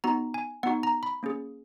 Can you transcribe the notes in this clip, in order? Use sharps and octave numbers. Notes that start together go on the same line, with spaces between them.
B3 D#4 F#4 A#5
G#5
B3 D#4 F#4 F#5
A#5
B5
A#3 C#4 G#4